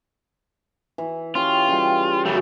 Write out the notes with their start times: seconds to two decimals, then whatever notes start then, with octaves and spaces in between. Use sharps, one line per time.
0.98 E3
1.35 C#4 F4 G4
1.68 C#3 G3
2.25 F#2 C#3 E3 A3